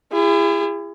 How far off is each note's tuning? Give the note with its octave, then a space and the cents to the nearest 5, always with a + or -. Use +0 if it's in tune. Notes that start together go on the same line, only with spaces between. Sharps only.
E4 +35 G#4 -35